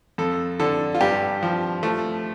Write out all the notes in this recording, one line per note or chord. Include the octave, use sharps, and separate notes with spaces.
F2 A4
D3 A4
F4
G2 G4
F3
F3 A3